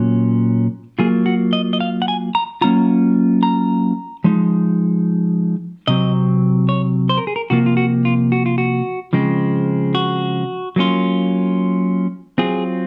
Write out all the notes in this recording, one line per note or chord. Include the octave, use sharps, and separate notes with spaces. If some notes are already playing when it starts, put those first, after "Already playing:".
Already playing: A#2 F#3 C#4
F#3 A#3 F4 G#4
F#4
D#5
D#5
F5
F#5
G#5
A#5
F#3 A#3 C#4 F4 A#5
A#5
F3 G#3 D#4
C3 F#3 C4 D#5
C#5
C5
A#4
G#4
A#4
C3 F3 A#3 F4 F#4
F4
F#4
F4
F#4
F4
F#4
C#3 F3 G#3 C4
F#4
F#3 A#3 C#4 F4
F#3 C4 F4 G#4